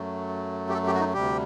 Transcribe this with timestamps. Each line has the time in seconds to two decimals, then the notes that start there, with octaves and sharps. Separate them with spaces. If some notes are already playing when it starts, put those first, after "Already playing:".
Already playing: F#2 F#3 A3
0.69 G4
0.73 A4
0.86 G4
0.94 F#4
1.00 D#4
1.13 D2 C3 G3 G4